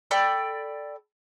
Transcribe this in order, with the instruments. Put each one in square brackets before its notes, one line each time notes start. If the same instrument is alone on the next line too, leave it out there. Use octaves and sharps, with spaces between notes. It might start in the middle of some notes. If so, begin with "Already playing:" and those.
[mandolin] A4 D5 G5 B5